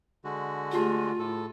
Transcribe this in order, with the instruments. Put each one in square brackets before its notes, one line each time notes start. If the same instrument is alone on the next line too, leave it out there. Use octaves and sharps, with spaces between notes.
[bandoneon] D3 G#3 F#4
[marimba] A3 G4 G#4 [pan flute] F4
[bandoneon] A2 A4